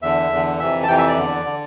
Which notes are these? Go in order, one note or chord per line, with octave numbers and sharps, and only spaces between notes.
E2 D3 E5
E2 D3
F2 C3 E3 E5
A5
F2 C3 E3 G5
E5
D5
E2 D3
D3